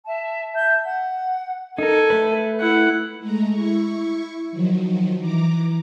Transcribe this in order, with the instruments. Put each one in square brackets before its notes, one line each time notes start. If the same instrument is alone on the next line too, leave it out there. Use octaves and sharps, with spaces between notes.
[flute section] E5 A5
E5 A5 G6
F#5
[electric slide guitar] D#4 A#4 [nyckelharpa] A4 G#5
[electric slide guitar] A3 B4
[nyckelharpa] E4 F#5
[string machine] G#3 A3 A#5
E4 C#6
D#3 F3 F#3
E3 A#5 D6